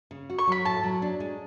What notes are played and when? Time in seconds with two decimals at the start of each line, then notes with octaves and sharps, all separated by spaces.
0.11 C#3
0.30 F#4
0.39 C#6
0.47 F#3 B5
0.65 A2 A5
0.83 F#3
1.02 D4
1.20 G#3